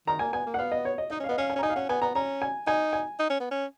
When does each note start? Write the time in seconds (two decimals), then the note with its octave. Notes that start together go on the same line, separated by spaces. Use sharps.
0.07 D#3 A#5
0.19 A#3 G#5
0.33 B3 G#5
0.46 A#3
0.54 F#5
0.59 B3 F5
0.72 D#5
0.85 C#5
0.98 D#5
1.10 D#4 D#5
1.20 C#4 F5
1.29 B3 D#5
1.38 C#4 F5
1.50 G#5
1.56 C#4
1.59 A#5
1.63 D#4 G#5
1.70 F5
1.76 C#4 F#5
1.89 B3 G#5
2.01 B3 A#5
2.15 C#4 A#5
2.42 G#5
2.67 D#4 G#5
2.93 G#5
3.19 D#4
3.30 C#4
3.40 B3
3.51 C#4